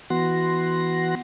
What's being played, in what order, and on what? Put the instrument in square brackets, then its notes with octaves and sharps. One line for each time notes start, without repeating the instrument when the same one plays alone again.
[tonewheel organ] E3 B3 F#4 F#5 C6 A#6